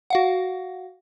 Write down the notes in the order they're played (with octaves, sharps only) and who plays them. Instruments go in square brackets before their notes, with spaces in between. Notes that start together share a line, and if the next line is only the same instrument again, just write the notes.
[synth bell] F#4 F5 F#5